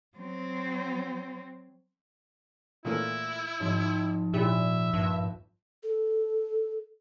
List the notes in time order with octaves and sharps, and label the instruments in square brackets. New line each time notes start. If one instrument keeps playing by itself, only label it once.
[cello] F#3 C4
[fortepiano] A#2 E3 A3 [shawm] E4
[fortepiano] G#1 [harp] G#2 F3 C4
[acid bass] A#2 [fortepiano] E4 G4 [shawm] E5
[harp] A#1 [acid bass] G2
[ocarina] A4